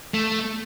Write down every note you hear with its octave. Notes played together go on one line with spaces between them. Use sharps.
A3